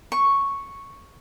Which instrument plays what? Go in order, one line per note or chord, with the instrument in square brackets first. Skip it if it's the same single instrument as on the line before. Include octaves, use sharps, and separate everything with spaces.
[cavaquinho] C#6